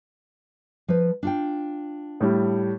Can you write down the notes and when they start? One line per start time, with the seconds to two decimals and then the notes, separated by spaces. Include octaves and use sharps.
0.88 F3 B4
1.23 D4 F4 G5
2.21 A2 G3